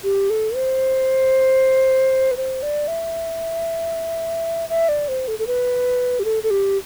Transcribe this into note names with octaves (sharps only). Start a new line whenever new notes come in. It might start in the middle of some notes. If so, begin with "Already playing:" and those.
G4
A4
C5
B4
C5
D5
E5
E5
D5
C5
A4
A4
B4
G4
A4
A4
G4